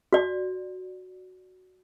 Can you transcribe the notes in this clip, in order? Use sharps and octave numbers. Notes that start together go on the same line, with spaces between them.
F#4 D5